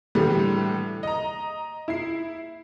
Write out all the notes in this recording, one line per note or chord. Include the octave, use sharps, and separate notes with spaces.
A2 D3 E3 G3
D#5 A#5
E4 C7